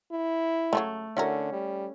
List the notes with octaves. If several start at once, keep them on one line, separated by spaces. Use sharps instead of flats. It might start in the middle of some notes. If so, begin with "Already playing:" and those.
E4
C#3 F3 F#3 A3
D3 C#4 E4 F#4 A#4
G3